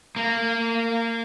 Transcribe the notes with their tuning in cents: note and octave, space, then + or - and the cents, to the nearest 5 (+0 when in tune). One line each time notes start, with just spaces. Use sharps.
A#3 -25